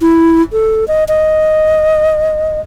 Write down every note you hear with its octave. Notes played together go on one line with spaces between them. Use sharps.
E4
A4
D#5
D#5